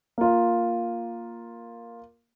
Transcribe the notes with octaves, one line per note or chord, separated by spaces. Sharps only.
A#3 F4